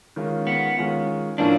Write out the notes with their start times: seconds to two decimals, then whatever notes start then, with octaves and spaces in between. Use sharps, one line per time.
0.16 D#3 G#3 C#4 F4
0.47 B3
0.78 D#3 G#3 C#4 F4
1.38 A2 F3 A#3 C#4 D4 E4